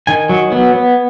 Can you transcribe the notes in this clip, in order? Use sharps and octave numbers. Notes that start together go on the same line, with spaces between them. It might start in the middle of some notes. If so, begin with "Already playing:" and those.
D#3 G#5
F#3
B3
B3